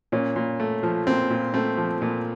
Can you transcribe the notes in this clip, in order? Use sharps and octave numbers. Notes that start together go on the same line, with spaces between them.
A#2 C#4
A#2
A3
F3
A#2 C4
A#2
A3 C4
F3
A#2